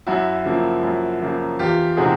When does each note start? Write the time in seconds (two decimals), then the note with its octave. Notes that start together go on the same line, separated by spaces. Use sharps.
0.07 F#2 E4 F#4
0.45 C#3 F3 A#3
0.83 F#2
1.21 C#3 F3 A#3
1.59 E2 F4 G4
1.97 C3 D#3 G#3 C4 F#4 G#4